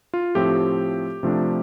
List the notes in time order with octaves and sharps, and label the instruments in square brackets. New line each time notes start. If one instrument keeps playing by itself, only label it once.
[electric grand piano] F4
A2 F3 A3 C4 G4
C3 F3 A3 D4